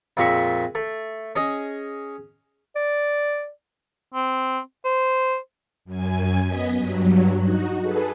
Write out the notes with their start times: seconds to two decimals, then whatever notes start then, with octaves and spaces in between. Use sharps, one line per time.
0.17 F2 A#2 G#3 E5 C#6
0.75 A3
1.36 C#4 G#4 D#5
2.76 D5
4.14 C4
4.85 C5
5.85 F#2 G#5
6.46 B3 D#5 B6
6.77 G2 F#3
7.37 D#4 F#4
7.81 G#4 A4 B4